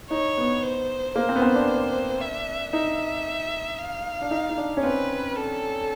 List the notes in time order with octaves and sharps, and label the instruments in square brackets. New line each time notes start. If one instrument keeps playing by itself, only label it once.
[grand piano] D#4 [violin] C#5
[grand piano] B3
[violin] C5
[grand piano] A#3 [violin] C5
[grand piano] C4
B3
C4
D4
[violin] E5
[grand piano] D#4 [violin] E5
[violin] F5
[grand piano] D4
D#4
D#4
D4
C#4
[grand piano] C4 [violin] B4
[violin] A4